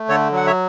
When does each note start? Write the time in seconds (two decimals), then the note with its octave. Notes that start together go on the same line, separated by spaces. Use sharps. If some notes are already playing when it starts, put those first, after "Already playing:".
Already playing: A3
0.09 D3 A4 C#5
0.32 F#3 F#5
0.47 C#5 E5